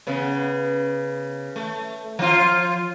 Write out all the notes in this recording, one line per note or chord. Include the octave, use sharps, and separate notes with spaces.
C#3 B3
A3
F3 F4